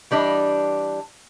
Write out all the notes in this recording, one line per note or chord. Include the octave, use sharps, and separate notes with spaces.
E3 G3 D4 D#5